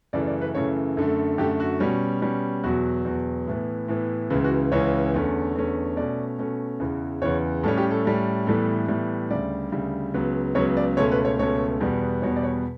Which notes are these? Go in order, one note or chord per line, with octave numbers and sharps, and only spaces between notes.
F#2 C#3 E3 A3 D5
D5
B4
F#2 C#3 E3 A3 C#5
F#2 D3 A3 A4
F#2 D3 A3 G4
F#4
B2 G3 C#4
B2 G3 C#4
E2 B2 F#3 F#4
E2 B2 F#3
A2 E3 B3
A2 E3 B3
C#2 C#3 E3 E4
F#4
C#2 C#3 E3 C#5
E2 D3 A3 C#4
E2 D3 A3 C#4
B2 A3 C#4 D5
B2 A3 C#4
E2 C#3 E3
E2 C#3 E3 C#5
A2 G3 C#4 A4
G4
A4
A2 G3 C#4
A2 E3 G3 B3 A4
A2 E3 G3 B3
D2 C#3 G3 D5
D2 C#3 G3
C#2 C#3 F#3 B3
C#2 C#3 F#3 B3 C#5
D5
C#2 B2 A3 C#4 C#5
B4
C#5
C#2 B2 A3 C#4 C#5
E2 B2 G3 B3
E2 B2 G3 B3 C#5
D5
C#5